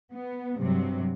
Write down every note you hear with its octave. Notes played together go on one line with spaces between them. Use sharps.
B3
G2 C3 F#3